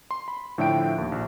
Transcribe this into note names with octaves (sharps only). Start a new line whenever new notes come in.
C6
B5
A2 D3 F3 E5 G5 D7
D#2
A#1